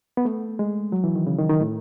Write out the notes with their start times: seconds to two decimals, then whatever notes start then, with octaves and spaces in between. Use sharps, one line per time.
0.17 B3
0.25 A3
0.59 G#3
0.92 F#3
1.04 E3
1.15 D#3
1.27 C#3
1.39 D#3
1.50 D#3
1.61 A2